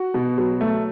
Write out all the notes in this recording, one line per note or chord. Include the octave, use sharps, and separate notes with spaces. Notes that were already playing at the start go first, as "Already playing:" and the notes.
Already playing: F#4
B2
F#3
A3